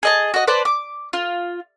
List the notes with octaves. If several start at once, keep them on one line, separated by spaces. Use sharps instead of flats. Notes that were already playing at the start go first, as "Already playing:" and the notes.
G#4 D#5 A5
F#4 D#5
B4 C5 D5 A5
D6
F4